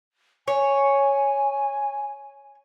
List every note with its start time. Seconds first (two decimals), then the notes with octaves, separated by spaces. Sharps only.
0.48 C#5 G#5